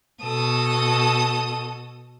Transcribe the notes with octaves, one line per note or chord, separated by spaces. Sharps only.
B2 A4 D#6